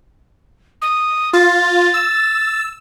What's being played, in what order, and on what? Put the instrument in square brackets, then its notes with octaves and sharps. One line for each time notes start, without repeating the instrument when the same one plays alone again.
[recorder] D#6
[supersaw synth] F4 [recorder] A6
[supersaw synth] E6